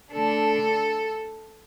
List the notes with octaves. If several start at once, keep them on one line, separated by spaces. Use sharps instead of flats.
D3 A3 D4 A4